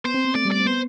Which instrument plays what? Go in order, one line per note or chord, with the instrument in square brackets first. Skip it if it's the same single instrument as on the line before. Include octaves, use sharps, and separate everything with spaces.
[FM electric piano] B3 [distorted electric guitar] C5
[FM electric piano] C4
B3
[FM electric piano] A3 [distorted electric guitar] D5
[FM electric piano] G3
[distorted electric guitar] D5
[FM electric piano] C4
[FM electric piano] B3 [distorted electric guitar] C5